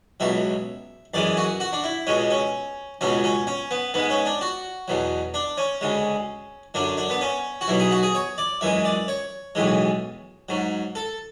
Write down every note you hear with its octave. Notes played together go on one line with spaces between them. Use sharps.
C#2 B2 F#3 E5
F#2 E3 G#3 D5
F#4
F#4
D4
E4
C#2 B2 G#3 C#4
C#4
C#2 B2 F#3 C#4
C#4
C#4
B3
G#2 G#3 B3
C#4
D4
F#4
E2 B2 F#3
D4
C#4
D2 C#3 G#3
F#2 D3 F#3 D4
D4
B3
C#4
F#4
B1 B2 F#3 E4
G#4
F#4
G#4
C#5
D5
F#2 E3 G#3 E5
D5
C#5
B1 A2 E3 G#3
G#2 F#3
A4